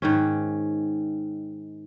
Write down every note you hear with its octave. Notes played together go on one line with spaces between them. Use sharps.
G#2 D#3 C#4